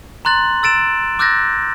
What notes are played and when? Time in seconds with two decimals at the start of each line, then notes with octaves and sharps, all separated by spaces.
0.25 A#5 C6 F#6 A6 F#7
0.63 E6 A6 D7 E7
1.19 D6 E6 F#6 G6 A6 A#6